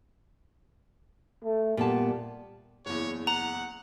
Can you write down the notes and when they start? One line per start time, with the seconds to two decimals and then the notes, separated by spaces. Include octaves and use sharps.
1.44 A3
1.77 A#2 G3 B3 A5
2.86 F#1 E2 C#5
3.27 F#5 A#5